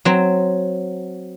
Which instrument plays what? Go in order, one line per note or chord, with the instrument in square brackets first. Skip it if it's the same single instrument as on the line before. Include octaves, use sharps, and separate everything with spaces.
[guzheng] F#3 C4